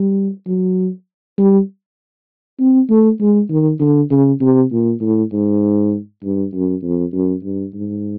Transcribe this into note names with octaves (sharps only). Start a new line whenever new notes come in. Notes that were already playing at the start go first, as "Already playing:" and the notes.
Already playing: G3
F#3
G3
C4
A3
G#3
D#3
D3
C#3
C3
A#2
A2
G#2
G2
F#2
F2
F#2
G2
G#2